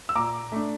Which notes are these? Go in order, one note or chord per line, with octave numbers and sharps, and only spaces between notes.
E6
A#2 A#5 D6
A3 D4